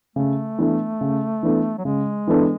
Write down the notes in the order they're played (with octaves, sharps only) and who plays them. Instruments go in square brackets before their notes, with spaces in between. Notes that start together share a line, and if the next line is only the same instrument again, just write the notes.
[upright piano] C#3 [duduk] A3
[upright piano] E3 B3 D4 A4
C#3
E3 B3 D4 A4
[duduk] F#3
[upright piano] C#3 [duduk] G#3
[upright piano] E3 B3 D4 A4